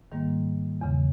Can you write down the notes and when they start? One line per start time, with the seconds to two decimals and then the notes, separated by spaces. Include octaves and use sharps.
0.12 G#2 D#3 G3 A#3
0.81 E2 C#3 E3